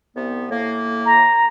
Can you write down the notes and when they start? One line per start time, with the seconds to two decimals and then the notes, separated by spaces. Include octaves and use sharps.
0.15 C2 C3 B3
0.51 A2 A#3
1.06 A#5